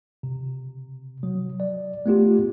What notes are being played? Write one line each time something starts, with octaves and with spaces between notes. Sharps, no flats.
C3
F#3
D5
A3 B3 F4 G4